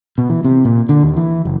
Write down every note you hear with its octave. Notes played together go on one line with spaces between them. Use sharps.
B2
E3
C3
A#2
D3
D#2
E3
F#1